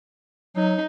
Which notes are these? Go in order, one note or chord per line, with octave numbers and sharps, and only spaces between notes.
F#3 D#4